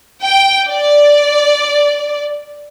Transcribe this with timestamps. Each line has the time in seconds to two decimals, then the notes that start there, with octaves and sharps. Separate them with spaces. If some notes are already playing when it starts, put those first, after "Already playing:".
0.22 G5
0.67 D5